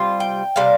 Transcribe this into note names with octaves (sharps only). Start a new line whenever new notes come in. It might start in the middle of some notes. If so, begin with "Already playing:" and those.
Already playing: C3 G3 F4
G5
C3 G3 D4 F5